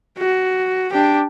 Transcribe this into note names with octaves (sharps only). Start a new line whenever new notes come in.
F#4
D4 G4